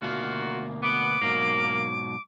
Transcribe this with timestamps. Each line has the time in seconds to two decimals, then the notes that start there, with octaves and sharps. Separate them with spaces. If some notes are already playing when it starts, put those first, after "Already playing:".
0.02 D2 B2 D#3 A#3 F4 F#4
0.82 B3 D6
1.22 G#2 B2 F#3 A#3